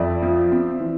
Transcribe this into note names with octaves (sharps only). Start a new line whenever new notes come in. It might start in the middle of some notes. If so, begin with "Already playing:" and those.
Already playing: F2 D5 E5
F3
C4
E3